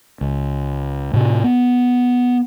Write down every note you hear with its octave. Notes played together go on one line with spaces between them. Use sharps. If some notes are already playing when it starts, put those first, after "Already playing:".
C#2
A2 C3
B3